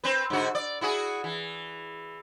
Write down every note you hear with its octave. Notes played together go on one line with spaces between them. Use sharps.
C4 B4
G#2 D3 F#4
D5
E4 F#4 G#4
E3